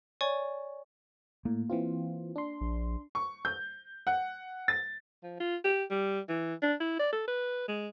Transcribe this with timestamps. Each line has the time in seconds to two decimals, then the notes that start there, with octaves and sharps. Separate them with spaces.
0.21 C#5 D5 G#5 C#6
1.45 A2 A#3
1.70 E3 C4 F4
2.36 D4 C6
2.61 A#1
3.15 C#6
3.45 G6
4.07 F#5
4.68 A6
5.23 F3
5.40 F4
5.64 G4
5.90 G3
6.29 E3
6.62 D4
6.80 E4
6.99 D5
7.13 A4
7.27 B4
7.68 G#3